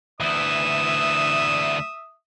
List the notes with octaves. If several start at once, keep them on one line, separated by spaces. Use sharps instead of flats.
D2 E3 E5 D#6